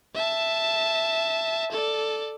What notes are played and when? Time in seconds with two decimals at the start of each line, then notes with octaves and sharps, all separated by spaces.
0.14 E5 A5
1.71 A4 D5